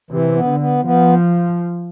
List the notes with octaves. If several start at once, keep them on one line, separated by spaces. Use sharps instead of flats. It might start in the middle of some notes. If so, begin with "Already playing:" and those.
C3 E3
B3
D3
B3
F3 B3